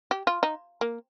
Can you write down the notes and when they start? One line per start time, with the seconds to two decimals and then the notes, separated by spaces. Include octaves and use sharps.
0.11 G4
0.27 F4
0.43 D#4
0.81 A#3